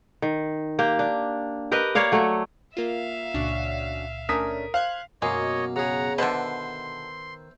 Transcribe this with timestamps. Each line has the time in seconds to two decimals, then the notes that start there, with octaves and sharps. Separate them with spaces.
0.22 D#3
0.79 A#3 G4
0.99 D4
1.72 G4 A#4 B4 D#5
1.95 A#3 C#5 D5 F5
2.12 F#3 A3
2.77 A#3 F4 E5 F5
3.34 C#2 A#2 C#4 D4 F#4
4.29 A3 C#4 D4 A#4 D#6 B6
4.74 C5 F5 F#6 G#6
5.22 F#2 B2 G#3 A#3 F#4 C#5 D#5
5.76 C#3 G#4 F#5 A#5
6.18 B2 D3 D#3 B4 C5 E5 C6